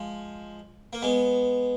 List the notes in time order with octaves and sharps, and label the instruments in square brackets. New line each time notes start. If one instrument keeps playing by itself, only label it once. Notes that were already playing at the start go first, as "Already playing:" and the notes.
Already playing: [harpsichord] F3 G#3
A#3
G#3 B3